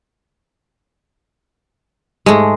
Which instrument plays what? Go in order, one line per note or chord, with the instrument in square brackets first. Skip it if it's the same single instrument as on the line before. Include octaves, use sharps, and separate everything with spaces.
[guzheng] G#2 A3 [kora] G#3